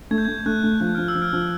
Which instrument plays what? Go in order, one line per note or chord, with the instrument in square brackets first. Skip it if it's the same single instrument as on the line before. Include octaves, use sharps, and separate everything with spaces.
[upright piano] A3 [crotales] G#6
[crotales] G6
G#6
[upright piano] A3
[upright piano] A3 [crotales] F#6
[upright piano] A3
[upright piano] F3 [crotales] F#6
[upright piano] F3 [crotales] F6
[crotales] E6
[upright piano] F3
[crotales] F6
[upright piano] F3